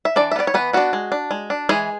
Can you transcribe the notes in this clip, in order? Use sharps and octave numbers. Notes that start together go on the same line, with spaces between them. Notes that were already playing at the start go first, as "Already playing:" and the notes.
E5
E3 D4 D5
E5
B3 D4 D5
C#5
E3 B3 B4
B3 D4 F#4
G#3
D4
G#3
D4
E3 G#3 G#4